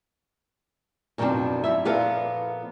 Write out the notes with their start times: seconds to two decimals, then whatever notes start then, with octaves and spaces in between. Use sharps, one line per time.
1.18 F#2 B2 D#3 F3 C4 D4
1.64 F#2 E4 E5
1.85 A#2 F3 B3 F4 A4 F5